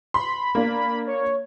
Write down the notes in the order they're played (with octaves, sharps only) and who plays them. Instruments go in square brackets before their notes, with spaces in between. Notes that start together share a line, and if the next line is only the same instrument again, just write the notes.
[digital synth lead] B5 [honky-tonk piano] C6
[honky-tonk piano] A#3 D4
[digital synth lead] C#5